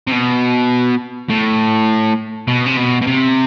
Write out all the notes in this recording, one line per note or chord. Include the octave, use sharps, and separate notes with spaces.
C3
B2
A2
B2
C3
B2
B2
C3